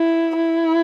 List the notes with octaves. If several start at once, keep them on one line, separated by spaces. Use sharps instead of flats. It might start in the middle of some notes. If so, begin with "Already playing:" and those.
Already playing: E4
E4